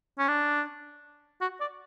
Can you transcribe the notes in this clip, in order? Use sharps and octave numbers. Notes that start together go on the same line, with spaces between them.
C#4
D4
F#4
D5